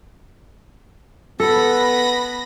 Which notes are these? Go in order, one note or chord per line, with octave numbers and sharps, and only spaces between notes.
B3 A4 B5 A#6